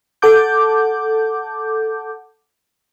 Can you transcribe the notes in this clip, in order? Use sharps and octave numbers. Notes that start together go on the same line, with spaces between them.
A4 F#5 A5 D6 G6